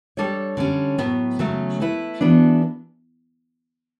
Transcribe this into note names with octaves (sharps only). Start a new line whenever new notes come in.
G3 D4 A4 C#5
D3 G3 C#4
A2 F#3 B3
C#3 F#3 A3 C#4
A3 E4 B4
E3 B3 D4 F#4 A4